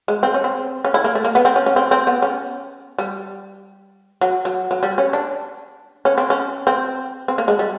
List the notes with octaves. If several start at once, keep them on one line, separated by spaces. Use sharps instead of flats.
G#3
C4
C#4
C4
C#4
E4
A#3
A3
A#3
B3
C4
C#4
C#4
C4
C4
B3
C#4
G3
F#3
F#3
F#3
G3
C#4
D4
C#4
C4
C#4
C4
C4
A#3
G#3
G3